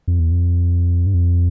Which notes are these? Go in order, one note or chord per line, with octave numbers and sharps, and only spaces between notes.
F2
E2
F2
G2
F2